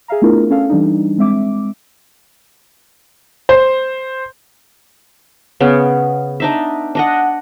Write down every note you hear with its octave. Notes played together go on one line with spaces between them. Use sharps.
G#4 E5 F5 A#5
A3 B3 D4 E4 F4 A#4
C#4 A4 F5
E3 G3 D4 D#4
G#3 C4 E5 D6
C5
C#3 B3
D4 D#4 E5
D4 D#5 F#5